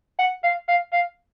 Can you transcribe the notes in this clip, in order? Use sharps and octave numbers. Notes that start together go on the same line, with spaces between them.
F#5
F5
F5
F5